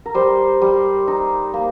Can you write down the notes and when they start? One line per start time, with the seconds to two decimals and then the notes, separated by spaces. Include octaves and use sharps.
0.06 A#4
0.14 G3 C5
0.62 G3
1.07 D#4
1.54 A#3